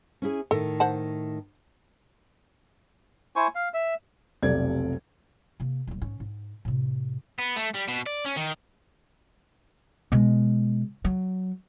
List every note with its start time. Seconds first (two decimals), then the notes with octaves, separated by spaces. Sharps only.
0.22 C#4 E4 G#4
0.51 A2 D#3 A4
0.80 C5 F#5 A5
3.36 E4 C5 G#5 C#6
3.55 F5
3.74 E5
4.43 F1 B1 C3 A4 D5 G#6
5.60 C3 A#3
5.87 D#1 G3
6.02 G#2 C#4
6.20 G#2
6.65 A2 C3
7.39 B3
7.57 A3
7.75 G3
7.88 B2
8.06 D5
8.25 C#4
8.36 D#3
10.12 B2 G#3
11.05 F#3